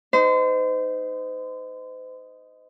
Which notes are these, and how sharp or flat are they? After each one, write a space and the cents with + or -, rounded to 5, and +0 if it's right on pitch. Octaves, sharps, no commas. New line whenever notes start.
D#4 +0 C5 -35